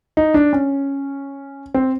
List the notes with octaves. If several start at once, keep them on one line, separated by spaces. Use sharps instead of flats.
D#4
D4
C#4
C4